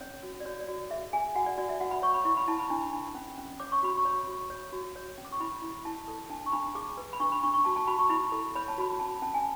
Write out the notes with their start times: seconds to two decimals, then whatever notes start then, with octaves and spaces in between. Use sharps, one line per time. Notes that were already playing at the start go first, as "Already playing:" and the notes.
0.01 C#4 C#5
0.23 F#4
0.40 D5
0.45 F#4 C#5
0.60 D5
0.68 F#4
0.90 G#4 E5
1.13 G#4 G#5
1.35 F#4 F#5
1.46 D5
1.58 F#4 D5
1.69 E5
1.80 F#4 F#5
1.91 B5
2.02 C#5 C#6
2.14 B5
2.25 E4 C#6
2.37 B5
2.48 E4 A5
2.59 B5
2.70 D4
2.93 D4
3.15 C#4
3.38 C#4
3.60 C#5 D6
3.72 C#6
3.83 F#4 B5
3.97 C#6
4.05 C#5
4.27 F#4
4.50 C#5
4.73 F#4
4.95 C#5
5.18 C#4
5.25 D6
5.32 C#6
5.40 E4 B5
5.62 E4
5.85 E4 A5
6.08 A4
6.30 D4 A5
6.46 C#6
6.52 D4 B5
6.75 G#4 D6
6.97 B4
7.13 B5
7.20 D4 C#6
7.32 B5
7.43 D4 C#6
7.54 C#6
7.65 F#4 A5
7.76 A5
7.87 F#4 B5
7.99 C#6
8.09 E4 B5
8.32 A4
8.55 C#5 B5
8.68 A5
8.78 F#4 B5
8.99 C#4 A5
9.22 C#4 A5
9.34 G#5